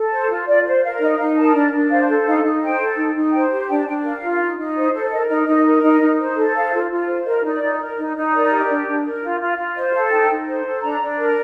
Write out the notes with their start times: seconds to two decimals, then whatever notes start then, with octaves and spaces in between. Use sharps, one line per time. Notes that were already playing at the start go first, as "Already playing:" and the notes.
Already playing: A4
0.11 C5
0.29 F4
0.47 F4 D5
0.65 C5
0.83 A#4 F5
1.00 D#4 D#5
1.18 D#4 F5
1.36 A#4 A5
1.54 D4
1.73 D4
1.89 C5 F5
2.08 A4
2.26 D#4 F5
2.43 D#4
2.61 C5 G5
2.79 A4
2.97 D#4
3.15 D#4
3.32 C5 G5
3.51 G4
3.68 D4 G5
3.81 A5
3.86 D4 G5
4.04 A#4 F5
4.22 F4
4.39 D#4
4.58 D#4
4.75 C5
4.93 A4
5.11 A#4 D#5
5.29 D#4 D#5
5.47 D#4 D#5
5.65 A#4
5.83 D#4 D#5
6.01 D#4
6.18 C5
6.36 A4
6.54 C5 F5
6.72 F4
6.89 F4
7.07 C5
7.25 A#4 D#5
7.43 D#4 D5
7.61 D#4
7.79 A#4
7.97 D#4
8.15 D#4
8.32 A#4 D5
8.50 G4
8.69 D4
8.86 D4
9.04 A#4
9.21 F4
9.40 F4
9.57 F4
9.75 C5 D#5
9.93 A4 F5
10.11 D#4 G5
10.29 D#4
10.47 C5
10.64 A4
10.82 D4 A#5
11.00 D4
11.18 A#4